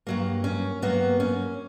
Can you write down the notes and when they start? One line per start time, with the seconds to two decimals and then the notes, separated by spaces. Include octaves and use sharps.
0.07 G2 F#3 A#3
0.44 C#4
0.82 G2 F#3 A#3 B3
1.20 C#4